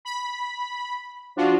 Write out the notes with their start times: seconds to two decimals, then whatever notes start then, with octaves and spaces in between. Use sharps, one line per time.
0.05 B5
1.36 F3 D4 F4 F#4